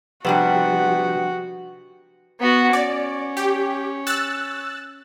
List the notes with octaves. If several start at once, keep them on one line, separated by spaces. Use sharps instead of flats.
C3 F3 G3 B3 D4 F#4 G4
B3 F#4
C#4 D5
G4
E6 F#6 A6